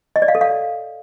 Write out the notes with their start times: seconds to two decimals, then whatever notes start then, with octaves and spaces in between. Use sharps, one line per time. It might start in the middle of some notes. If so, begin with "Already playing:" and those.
0.16 D#5
0.22 D5
0.28 F5
0.35 A4
0.41 F5